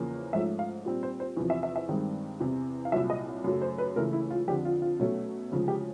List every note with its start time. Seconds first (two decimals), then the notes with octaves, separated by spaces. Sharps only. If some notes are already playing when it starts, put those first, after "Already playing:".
Already playing: E2 C#3 F3 A#3 C#4
0.33 G#2 F3 A3 C#4 E5
0.59 F5
0.85 A#2 G3 C4
1.03 C5
1.20 C5
1.37 E2 C3 F3
1.50 E5
1.63 E5
1.76 E5
1.89 G2 D#3 G#3 C4
2.40 E2 C3 E3
2.85 F5
2.92 C2 A#2 F#3 E5
3.10 D#5
3.44 F#2 C#3 F#3 A3
3.62 C5
3.78 B4
3.96 C#2 C#3 E3 A3 A#4
4.13 E4
4.30 F4
4.47 F2 D3 F3 G4
4.65 F4
4.82 F4
5.00 B2 F#3 A3 C#4
5.51 D2 C#3 F3 G#3
5.68 G4